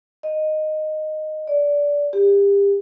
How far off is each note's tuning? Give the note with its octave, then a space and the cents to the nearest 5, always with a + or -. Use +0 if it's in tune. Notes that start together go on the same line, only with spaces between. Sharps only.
D#5 -10
D5 -20
G4 +35